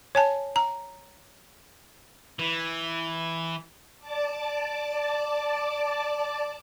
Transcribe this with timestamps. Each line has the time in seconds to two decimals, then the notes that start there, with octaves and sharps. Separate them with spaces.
0.15 C#5 G#5 A5
0.56 A#5
2.39 E3
3.99 D5 A5 D6